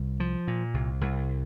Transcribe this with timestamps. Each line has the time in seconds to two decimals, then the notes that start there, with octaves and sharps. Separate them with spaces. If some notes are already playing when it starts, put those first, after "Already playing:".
Already playing: C2
0.20 F3
0.47 A#2
0.74 C2
1.01 C2